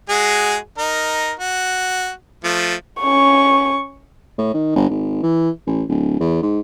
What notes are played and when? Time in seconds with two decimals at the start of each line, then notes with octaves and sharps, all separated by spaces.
0.09 G#3 F#4 G#4
0.78 D#4 A#4
1.39 F#4
2.44 F3 A3
3.00 C#4 C#6
4.38 A2
4.54 D#3
4.76 G1
4.89 G#1
5.23 E3
5.67 A1
5.89 D1
6.20 E2
6.43 G#2